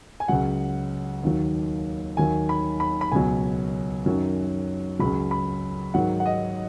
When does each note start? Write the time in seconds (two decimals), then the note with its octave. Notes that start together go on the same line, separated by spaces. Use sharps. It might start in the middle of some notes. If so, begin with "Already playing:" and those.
0.20 G#5
0.28 C#2 C#3 F#3 F#5
1.24 D#2 D#3 F#3
2.17 D#2 D#3 F#3 G#5
2.49 B5
2.80 B5
3.01 B5
3.12 C#2 B2 F#3 G#5
4.06 F#2 D#3 F#3
4.99 C#2 C#3 F#3 B5
5.31 B5
5.94 G#2 D#3 F#3 F#5
6.20 F#5
6.26 D#5